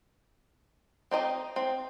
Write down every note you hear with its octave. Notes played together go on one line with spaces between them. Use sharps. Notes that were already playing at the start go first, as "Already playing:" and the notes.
C4 D#4 D5 D#5
C4